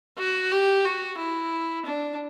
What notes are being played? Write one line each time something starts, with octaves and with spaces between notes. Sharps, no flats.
F#4
G4
F#4
E4
D4